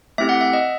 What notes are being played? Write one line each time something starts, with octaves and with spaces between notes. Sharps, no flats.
A3 C4 E4 G4 E5
F#5
E5
D#5